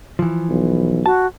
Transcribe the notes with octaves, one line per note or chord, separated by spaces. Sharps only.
E3 F3
B1
F#4 A5